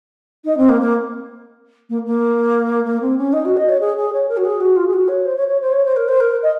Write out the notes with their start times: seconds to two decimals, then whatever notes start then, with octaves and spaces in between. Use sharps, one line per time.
0.45 D#4
0.57 C4
0.69 A#3
0.81 A#3
1.90 A#3
2.06 A#3
2.84 A#3
3.01 C4
3.18 C#4
3.33 D#4
3.45 F#4
3.57 D#5
3.69 C#5
3.80 G#4
3.97 G#4
4.13 C#5
4.29 A#4
4.37 F#4
4.45 G#4
4.60 F#4
4.76 F4
4.87 G#4
4.93 F#4
5.08 C#5
5.25 C5
5.37 C#5
5.48 C#5
5.61 C5
5.72 C#5
5.85 C5
5.96 A#4
6.08 C5
6.20 A#4
6.43 D#5